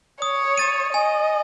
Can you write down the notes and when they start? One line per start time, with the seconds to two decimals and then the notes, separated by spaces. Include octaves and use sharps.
0.22 C#5 D#6
0.58 A6 D#7
0.93 D#5 G#5